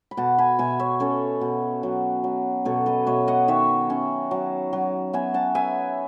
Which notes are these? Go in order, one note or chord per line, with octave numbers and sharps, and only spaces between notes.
B5
B2 F#5 A5
G#5 B5
B2 E5 G#5
C#5 E5
C#4 A4 C#5
B2
F#3
F#3
B2 A4 C#5
B4 D#5
B2 C#5 E5
D#5 F#5
D#3 C#5 E5
C#4
F#3
F#3
B3 E5 G#5
F#5 A5
B3 E5 G#5